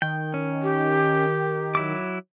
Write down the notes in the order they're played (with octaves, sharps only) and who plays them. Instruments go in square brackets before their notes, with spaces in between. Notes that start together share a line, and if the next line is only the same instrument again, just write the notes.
[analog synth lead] D#3 [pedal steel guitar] G5
[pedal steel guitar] C#4
[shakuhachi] G4
[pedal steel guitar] F#3 E4 D6